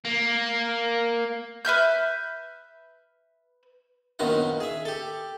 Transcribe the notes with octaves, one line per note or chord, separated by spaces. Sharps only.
A#3
B4 E5 F6 G6
A#1 F#2 B2 D#3 D#4 F#5
G#4 E5
G4 A4